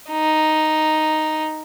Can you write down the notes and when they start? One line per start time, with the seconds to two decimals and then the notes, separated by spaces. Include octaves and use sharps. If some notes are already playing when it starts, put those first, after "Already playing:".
0.10 D#4